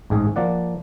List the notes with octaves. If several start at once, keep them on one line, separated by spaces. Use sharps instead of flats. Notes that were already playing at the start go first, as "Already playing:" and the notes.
A1 G#2 G#4
F3 A#3 D5 F#5